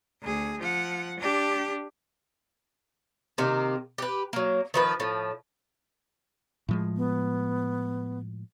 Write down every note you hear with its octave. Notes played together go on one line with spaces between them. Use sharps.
D2 G#4
F3 F#5
D4 G4
C3 D#3 A#3
G4 B4
F#3 A#3
D#3 F3 B4
A2 F3
A2 F3 G#3
B3